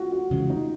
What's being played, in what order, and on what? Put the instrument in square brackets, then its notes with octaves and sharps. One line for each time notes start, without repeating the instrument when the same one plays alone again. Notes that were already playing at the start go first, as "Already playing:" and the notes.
Already playing: [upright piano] F4 F#4
F#4
[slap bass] F2 C#3 E3 G#3
[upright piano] D#4